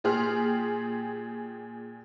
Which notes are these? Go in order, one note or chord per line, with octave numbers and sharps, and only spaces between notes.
A#2 G4 G#4 C6 F6